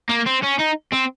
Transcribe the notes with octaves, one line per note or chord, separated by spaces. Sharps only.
A#3
C4
C#4
D#4
C4